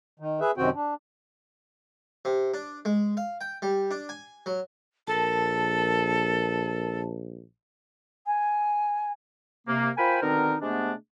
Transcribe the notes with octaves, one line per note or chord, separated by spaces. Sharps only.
D#3
G#4 B4 E5
F#2 C3 D#3 C4 F#4 G5
D4
C3
D4
G#3
F5
G5
G3
D4
G#5
F#3
A#1 A4 A#4 A5
G#5
C3 A#3
F4 A#4 C5 G5 G#5 B5
B2 D3 D#3 C4 D#4 A#4
C3 G#3 A3 B3 D4